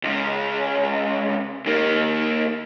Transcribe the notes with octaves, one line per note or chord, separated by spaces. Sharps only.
C#2 C#3
D#2 A#3